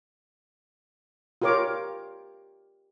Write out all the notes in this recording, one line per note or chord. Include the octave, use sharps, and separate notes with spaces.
F4 G4 A#4 C#5 D6